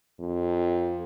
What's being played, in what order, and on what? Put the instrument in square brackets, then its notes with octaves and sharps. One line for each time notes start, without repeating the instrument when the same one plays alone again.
[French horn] F2